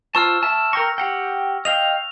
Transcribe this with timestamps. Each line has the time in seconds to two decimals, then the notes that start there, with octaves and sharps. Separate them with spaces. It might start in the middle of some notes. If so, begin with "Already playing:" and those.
0.15 F4 C5 A5 C#6 E6 F6
0.43 E5 A5
0.73 A#4 G5 C#6 A#6
0.98 G4 F#5 G5
1.65 D#5 F5 G5 F7